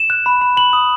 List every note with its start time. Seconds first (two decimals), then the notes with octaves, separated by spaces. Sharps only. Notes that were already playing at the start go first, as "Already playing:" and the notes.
Already playing: E7
0.10 F#6
0.26 B5
0.41 B5
0.57 B5 F#7
0.73 D#6